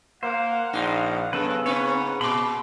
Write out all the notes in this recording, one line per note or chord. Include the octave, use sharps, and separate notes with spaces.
A#3 C5 F5 F#5
A#1 D#4
F#2 C#3 B3 A4 B4
G#2 C4 B4 C#5
A#2 B5 C6 D6